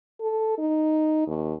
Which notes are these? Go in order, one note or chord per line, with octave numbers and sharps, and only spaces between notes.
A4
D#4
D#2